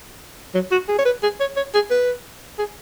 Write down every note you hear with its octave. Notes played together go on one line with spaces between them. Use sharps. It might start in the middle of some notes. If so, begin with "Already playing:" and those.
F#3
F#4
G#4
C#5
B4
G#4
C#5
C#5
G#4
B4
G#4